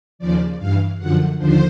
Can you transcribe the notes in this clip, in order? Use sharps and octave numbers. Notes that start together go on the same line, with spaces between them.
D#2 C#3 F3 D5
G2 E3 F5
F#2 D3 F3 F#5
D#2 D3 F3 C5